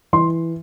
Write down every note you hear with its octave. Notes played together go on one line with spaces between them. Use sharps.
E3 C6